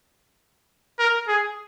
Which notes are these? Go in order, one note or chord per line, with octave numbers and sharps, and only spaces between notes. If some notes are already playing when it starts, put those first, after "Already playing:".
A#4
G#4